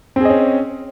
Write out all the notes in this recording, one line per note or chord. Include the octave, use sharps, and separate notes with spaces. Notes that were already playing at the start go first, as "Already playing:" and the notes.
C4 C#4 G#4 D#5